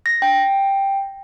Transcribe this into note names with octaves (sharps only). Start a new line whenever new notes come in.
A#6
G5